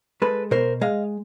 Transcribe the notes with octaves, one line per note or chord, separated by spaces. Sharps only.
G#3 A4 B4
B2 A#4 C5
G#3 D#5 F5